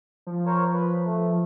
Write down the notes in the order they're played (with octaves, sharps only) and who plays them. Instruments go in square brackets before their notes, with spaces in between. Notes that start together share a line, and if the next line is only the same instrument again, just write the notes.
[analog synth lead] F3
[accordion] A#4 C5 C#5
B4
A3